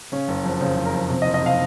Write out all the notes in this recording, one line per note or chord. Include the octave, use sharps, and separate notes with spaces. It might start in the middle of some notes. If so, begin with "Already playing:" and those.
C#3 C#4
F#1
F2
C#3 C5
F#1
A#4
F2
C3
D#5
F#1
D#5
C3 F5